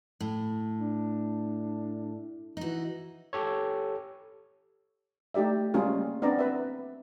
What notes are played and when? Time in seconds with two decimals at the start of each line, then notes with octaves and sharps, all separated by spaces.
0.21 A2
0.80 D4
2.57 E3 D#4 F#4
3.33 G4 A4 C#5
5.34 A3 D#4 G4 D5 E5
5.74 G3 G#3 A#3 C#4 F4 G#4
6.22 B3 C4 D4 D5 A#5
6.39 B4 E5